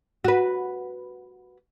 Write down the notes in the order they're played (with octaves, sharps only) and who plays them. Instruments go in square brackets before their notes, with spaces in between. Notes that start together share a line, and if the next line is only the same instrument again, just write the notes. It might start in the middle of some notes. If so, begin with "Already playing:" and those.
[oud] F#4 B4